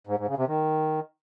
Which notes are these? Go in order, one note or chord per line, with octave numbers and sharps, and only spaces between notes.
G#2
G#2
C#3
C3
D#3